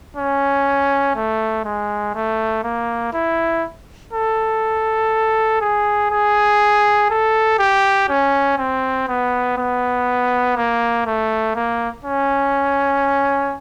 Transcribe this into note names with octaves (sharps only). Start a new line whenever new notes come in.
C#4
A3
G#3
A3
A#3
E4
A4
G#4
G#4
A4
G4
C#4
C4
B3
B3
A#3
A3
A#3
C#4